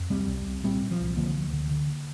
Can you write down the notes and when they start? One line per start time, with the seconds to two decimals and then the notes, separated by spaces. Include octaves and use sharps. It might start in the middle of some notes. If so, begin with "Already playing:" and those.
Already playing: F2
0.10 C2 G3 C4
0.28 C2
0.46 C2
0.64 A#2 G3 C4
0.82 A#2
0.91 F3
1.00 C2
1.17 D3 F3 A#3
1.35 D2
1.53 D3
1.71 D3